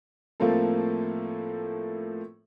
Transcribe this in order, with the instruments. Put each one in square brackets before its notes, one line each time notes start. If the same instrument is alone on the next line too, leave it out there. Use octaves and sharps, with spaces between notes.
[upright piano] A2 F3 A3 A#3 C4 A4